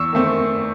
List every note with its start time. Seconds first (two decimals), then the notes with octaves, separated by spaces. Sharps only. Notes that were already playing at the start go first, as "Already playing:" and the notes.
Already playing: E2 C#6 E6
0.13 D#3 A3 C4